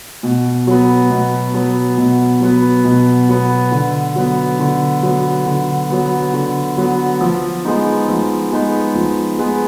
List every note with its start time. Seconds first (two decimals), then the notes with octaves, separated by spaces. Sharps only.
0.23 B2
0.67 F#3 B3
1.10 B2
1.54 F#3 B3
1.98 B2
2.41 F#3 B3
2.84 B2
3.29 F#3 B3
3.71 D3
4.16 F#3 B3
4.59 D3
5.03 F#3 B3
5.46 D3
5.89 F#3 B3
6.34 D3
6.78 F#3 B3
7.21 F3
7.65 G#3 B3 D#4
8.09 F3
8.52 G#3 B3 D#4
8.95 F3
9.39 G#3 B3 D#4